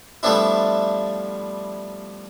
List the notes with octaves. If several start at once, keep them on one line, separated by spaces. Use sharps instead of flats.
F3 G3 A3 B3 D4 E4